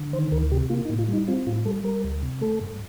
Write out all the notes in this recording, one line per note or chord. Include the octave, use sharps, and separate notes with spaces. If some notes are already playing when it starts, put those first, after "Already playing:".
Already playing: D3
D#3 C5
D2 A#4
C3 G4
A#3 F4
D#4
A2
F4
G3 D#4
C4 F4
A2 F4
G3 A4
G3 A#4
D2
C3
A3 A4
G2